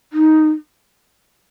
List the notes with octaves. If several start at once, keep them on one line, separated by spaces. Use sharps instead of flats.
D#4